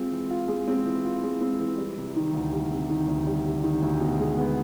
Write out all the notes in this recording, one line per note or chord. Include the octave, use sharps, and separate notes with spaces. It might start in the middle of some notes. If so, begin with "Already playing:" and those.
Already playing: G#3 C4 F4
E3
F4
G#3
C4
E3
F4
G#3
C4
E3
G3
C3
D#3
D2
G3
C3
D#3
D2
G3
C3
D#3
D2
B2
G#3
B3